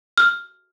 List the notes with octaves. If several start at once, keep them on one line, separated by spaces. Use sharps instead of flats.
F6